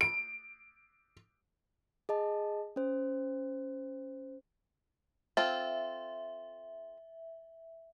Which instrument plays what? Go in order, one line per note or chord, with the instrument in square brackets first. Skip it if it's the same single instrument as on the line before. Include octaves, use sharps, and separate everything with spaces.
[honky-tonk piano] D7
[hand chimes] G#4 D#5 A5
C#4 C5
[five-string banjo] C4 F4 A4 [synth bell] E5